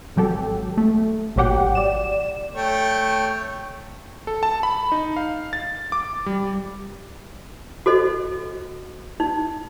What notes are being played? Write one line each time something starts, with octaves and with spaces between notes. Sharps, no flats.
G#1 F#3 G4 A4
A3
G#1 A#2 F#3 G4 F#5 G5
D5 E7
A3 C#5 G5
A4
A5
B5
D#4
F5
A6
D6
G3
F#4 A4 C5 D#5
D#4